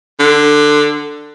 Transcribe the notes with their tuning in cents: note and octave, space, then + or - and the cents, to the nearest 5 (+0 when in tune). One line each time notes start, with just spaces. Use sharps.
D3 +15